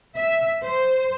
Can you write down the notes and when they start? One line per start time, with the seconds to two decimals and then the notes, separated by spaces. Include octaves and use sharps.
0.16 E5
0.63 C5